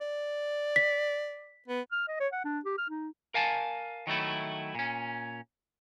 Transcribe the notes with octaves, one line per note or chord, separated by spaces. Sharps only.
D5
B6
B3
F6
D#5
C#5
F#5
D4
G4
F6
D#4
A#4 F5 G#5 A5
D#3 F#3 A3 E4
A#2 C#4